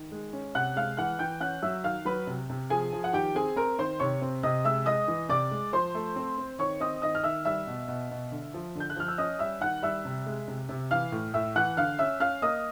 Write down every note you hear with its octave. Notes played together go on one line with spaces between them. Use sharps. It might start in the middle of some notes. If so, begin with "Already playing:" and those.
Already playing: D#3
G#3
C#4
C3 F#5 F#6
G#3 F5 F6
E3 F#5 F#6
E3 G5 G6
C#4 F#5 F#6
F#3 E5 E6
D#3 F5 F6
F#3 B4 B5
C3
C3
F3 G#4 G#5
F3
F#5
D#3 G4 G5
C4 G#4 G#5
C4 A#4 A#5
D#3 C5 C6
C3 C#5 C#6
C4
C3 D#5 D#6
G#3 E5 E6
G#3 D#5 D#6
E3
C3 D5 D6
G#3
F3 C5 C6
A3
C4
C4
D#3 C#5 C#6
C4 D#5 D#6
D#3 D#5 D#6
F6
D#3 E5 E6
G3 E5 E6
B2
B2
B2
D3
F3
D3
G6
F#6
F3 F6
E6
C#4 D#5 D#6
G3 E5 E6
D#3 F#5 F#6
G3 E5 E6
C3
G#3
C3
C3
E3 F5 F6
A2
A2 E5 E6
E3 F#5 F#6
D3 F5 F6
C#4 E5 E6
C#4 F5 F6
A#3 D#5 D#6